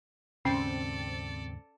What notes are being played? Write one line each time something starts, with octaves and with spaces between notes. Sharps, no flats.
D#2 G#2 C#3 C4 C#4 A4 D5